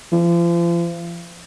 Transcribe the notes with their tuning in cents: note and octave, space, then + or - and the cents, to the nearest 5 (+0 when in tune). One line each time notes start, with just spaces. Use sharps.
F3 -40